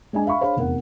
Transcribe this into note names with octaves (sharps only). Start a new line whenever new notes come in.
G#3 D4 D#5 G#5
E5 F5 B5 C#6
D4 G#4 C5 C#5 F5 B5
F1 E2 A#4 F#5